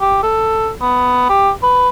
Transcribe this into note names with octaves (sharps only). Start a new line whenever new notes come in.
G4
A4
B3
G4
B4